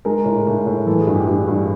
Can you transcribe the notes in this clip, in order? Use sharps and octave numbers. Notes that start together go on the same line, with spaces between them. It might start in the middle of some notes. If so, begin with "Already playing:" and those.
G#3 A#4
A2
A2
A2
E3 A4
G#4
G2
G4
G2
G2